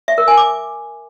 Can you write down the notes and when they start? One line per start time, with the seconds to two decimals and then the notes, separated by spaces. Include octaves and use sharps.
0.08 E5
0.18 A#4
0.28 G#5
0.37 D6